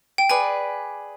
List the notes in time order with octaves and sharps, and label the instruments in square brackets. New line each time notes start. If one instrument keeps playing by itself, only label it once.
[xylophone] G5
[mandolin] G#4 B4 D5 [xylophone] G#5